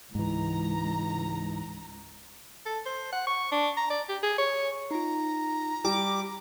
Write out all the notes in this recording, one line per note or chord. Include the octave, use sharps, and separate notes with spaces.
C#2 G#2 E3 A#5
A4
C5
F#5
C#6
D4
A#5
D5
G4
G#4
C#5
D#4 F4 A#5
G3 G4 D6